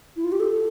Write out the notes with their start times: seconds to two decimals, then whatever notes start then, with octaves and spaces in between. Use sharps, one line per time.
0.16 E4
0.24 F4
0.32 G4
0.40 A4